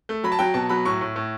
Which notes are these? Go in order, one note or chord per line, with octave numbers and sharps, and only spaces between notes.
A3
F#3 B5
A5
F#3 G5
B2 A5
F#3 B5
A2 C#6
A2
A2